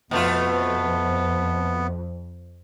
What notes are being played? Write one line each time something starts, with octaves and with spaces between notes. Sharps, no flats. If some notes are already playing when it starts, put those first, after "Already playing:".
F2 B2 A3 B3 F4